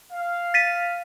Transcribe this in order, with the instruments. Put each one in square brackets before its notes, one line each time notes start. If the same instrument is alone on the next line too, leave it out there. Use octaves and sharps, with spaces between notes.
[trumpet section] F5
[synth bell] A6 B6 D#7